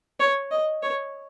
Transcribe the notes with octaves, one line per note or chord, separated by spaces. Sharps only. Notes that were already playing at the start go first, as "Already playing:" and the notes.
C#5
D#5
C#5